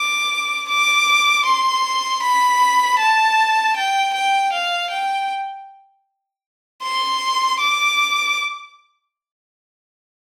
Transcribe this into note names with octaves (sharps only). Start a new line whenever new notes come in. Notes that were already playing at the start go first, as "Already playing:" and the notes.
Already playing: D6
D6
C6
B5
A5
G5
G5
F5
G5
C6
D6